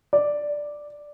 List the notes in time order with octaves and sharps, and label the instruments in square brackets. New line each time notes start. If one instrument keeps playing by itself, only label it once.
[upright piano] D5